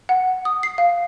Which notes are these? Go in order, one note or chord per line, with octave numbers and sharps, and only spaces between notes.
F#5
D#6
C7
F5